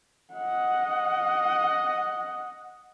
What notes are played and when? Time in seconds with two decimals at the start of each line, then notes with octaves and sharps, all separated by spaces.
0.33 D#5 F#5